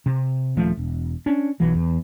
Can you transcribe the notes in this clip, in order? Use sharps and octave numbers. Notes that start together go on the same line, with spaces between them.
C3
D#1 F3 A3
E1
C#4 D4
B1 E3 F#3
E2